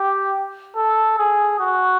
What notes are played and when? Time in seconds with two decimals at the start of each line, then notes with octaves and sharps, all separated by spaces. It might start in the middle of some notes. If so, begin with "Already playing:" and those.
Already playing: G4
0.76 A4
1.18 G#4
1.60 F#4